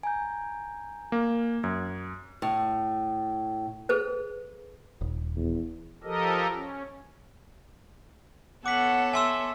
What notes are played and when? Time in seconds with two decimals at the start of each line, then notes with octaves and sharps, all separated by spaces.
0.03 G#5 A#5 G6
1.12 A#3
1.64 F#2 G#6
2.42 A2
3.89 G#4 A4 B4 C5
5.01 D#1
5.36 E2
6.03 F3 G4 A4 A#4 D#5
6.53 C#4
8.66 B3 A4 C#5 F#5 D6 B6 F#7
9.13 E5 G#5 C6 E6